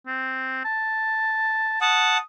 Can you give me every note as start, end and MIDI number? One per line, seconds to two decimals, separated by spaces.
0.07 0.63 60
0.65 1.77 81
1.81 2.18 78
1.81 2.18 81
1.81 2.22 87